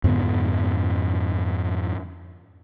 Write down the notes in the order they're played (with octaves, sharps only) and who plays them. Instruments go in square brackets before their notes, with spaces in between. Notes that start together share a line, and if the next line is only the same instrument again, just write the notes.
[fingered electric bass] F2 G#2 D3 B3